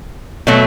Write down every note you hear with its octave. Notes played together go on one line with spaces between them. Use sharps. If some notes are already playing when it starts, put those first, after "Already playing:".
B2 F#3 A3